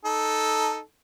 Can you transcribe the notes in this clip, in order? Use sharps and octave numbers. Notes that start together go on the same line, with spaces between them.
D#4 A4